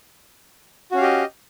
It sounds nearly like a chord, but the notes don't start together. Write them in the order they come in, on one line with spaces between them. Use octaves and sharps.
F#4 C#4 F5 G4 D#5